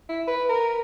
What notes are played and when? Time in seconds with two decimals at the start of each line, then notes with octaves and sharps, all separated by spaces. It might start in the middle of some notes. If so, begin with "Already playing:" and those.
0.09 E4
0.27 B4
0.49 A#4